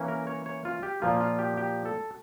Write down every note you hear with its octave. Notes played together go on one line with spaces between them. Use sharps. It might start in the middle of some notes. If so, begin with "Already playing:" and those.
Already playing: E3 A#3 C#4
A#4
C#5
C#5
F4
G4
A#2 F3 A#3 F4
F4
G4
G4
A4